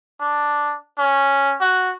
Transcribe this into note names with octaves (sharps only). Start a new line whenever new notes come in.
D4
C#4
F#4